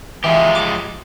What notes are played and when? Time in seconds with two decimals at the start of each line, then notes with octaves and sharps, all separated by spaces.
0.24 E3 F3 G#3 G4
0.55 D6